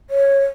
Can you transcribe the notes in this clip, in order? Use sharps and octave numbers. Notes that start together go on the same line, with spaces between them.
C#5